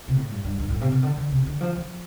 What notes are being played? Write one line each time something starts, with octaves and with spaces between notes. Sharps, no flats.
C3
A2
G2
G2
G2
A2
C3
C3
D3
D3
C3
D3
F3
F3